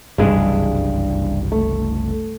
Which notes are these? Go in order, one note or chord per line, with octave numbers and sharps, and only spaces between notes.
F#1 C2 G2 E3 G#3 G#4
A3